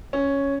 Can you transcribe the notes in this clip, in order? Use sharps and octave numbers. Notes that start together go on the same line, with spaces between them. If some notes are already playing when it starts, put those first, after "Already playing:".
C#4